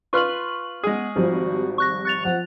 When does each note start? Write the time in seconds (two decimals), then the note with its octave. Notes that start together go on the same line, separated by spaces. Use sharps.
0.13 F4 B4 C6 C#6 F6 F#7
0.83 G#3 B3 G#4
1.16 G#1 F3 G3 F#4
1.78 C#6 F#6 A#6
2.05 C#6 F#6 A6 F7
2.25 F3 F#5